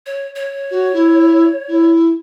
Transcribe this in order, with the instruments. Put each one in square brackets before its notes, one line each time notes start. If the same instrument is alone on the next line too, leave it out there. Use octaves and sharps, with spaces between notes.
[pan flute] C#5
C#5
[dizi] F#4
E4
E4